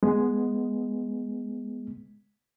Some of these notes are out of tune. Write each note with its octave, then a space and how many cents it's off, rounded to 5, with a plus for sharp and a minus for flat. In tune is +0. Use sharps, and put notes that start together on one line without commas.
G#3 +0 B3 +0